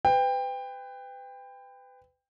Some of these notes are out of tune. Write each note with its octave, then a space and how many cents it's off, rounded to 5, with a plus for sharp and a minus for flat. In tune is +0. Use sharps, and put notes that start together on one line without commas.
B4 +30 G5 +20